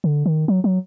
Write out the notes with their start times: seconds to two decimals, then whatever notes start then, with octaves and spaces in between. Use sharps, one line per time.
0.04 D3
0.26 D#3
0.48 F#3
0.64 F#3